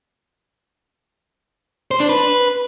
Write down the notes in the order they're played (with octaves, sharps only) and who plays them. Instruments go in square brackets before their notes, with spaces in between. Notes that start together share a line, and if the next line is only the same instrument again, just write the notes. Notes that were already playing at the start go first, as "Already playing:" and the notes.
[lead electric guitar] C5
D4
B4